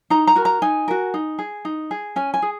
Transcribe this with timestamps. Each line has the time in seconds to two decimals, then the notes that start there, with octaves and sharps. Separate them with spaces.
0.10 D#4 A#5
0.27 A#5
0.36 F#4 A#4
0.45 A#5
0.62 D#4 G#5
0.88 F#4 A#4
1.14 D#4
1.39 G#4
1.65 D#4
1.91 G#4
2.16 C#4 G#5
2.34 G#5
2.42 G#4